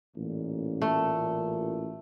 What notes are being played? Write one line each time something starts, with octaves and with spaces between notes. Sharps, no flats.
A1 A#2
A3